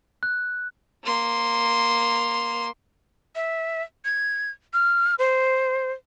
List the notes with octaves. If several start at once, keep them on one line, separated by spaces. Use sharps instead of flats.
F#6
A#3 C6
E5
G#6
F6
C5